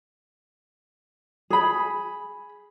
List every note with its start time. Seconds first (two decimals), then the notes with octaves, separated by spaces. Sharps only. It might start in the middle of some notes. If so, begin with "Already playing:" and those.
1.50 G#4 B5